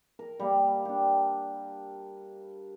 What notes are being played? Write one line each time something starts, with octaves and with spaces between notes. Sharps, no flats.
A#4
G3 A#3
D4 G4